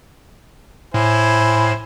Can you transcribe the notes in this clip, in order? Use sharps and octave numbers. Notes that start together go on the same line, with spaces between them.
A2 E4 C5 G#5